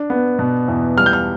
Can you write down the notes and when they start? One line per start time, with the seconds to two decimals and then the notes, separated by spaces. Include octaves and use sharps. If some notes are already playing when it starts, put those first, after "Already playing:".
Already playing: D4
0.10 B3
0.39 B2
0.68 E2
0.98 G3 F6
1.06 G6
1.13 F6